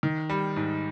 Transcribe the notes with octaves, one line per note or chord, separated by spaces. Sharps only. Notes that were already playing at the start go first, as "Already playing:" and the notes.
D#3
G3
G#2